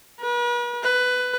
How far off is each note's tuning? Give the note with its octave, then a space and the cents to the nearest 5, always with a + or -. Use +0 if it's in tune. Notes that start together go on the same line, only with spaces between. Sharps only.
B4 -45
B4 +15